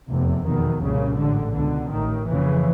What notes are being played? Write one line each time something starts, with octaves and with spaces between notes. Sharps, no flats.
F1 E2 C3
F1 E2 B2 D#3
C2 A#2 C#3
A1 G#2 D3
C#2 B2 D3
A1 A2 D#3
F#1 F2 C#3 E3